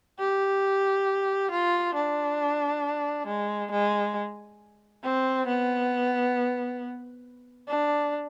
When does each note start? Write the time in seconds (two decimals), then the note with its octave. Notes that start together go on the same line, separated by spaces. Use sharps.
0.19 G4
1.51 F4
1.95 D4
3.27 G#3
3.72 G#3
5.04 C4
5.48 B3
7.68 D4